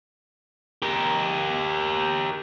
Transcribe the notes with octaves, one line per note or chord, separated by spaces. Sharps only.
G4 A#4